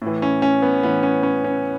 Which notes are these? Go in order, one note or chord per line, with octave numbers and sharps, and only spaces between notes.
A2 E3
C#4
C#4
B3
A2 E3 B3
C#4
C#4
C#4